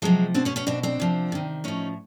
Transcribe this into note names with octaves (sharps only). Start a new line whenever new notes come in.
C3 F3 F#3 G#3
B2 C4 D4
B3 C#4
B3 C#4
B2 C4 D4
C4 D4
C3 F3
C3 D#3
A2 F3 C#4 D#4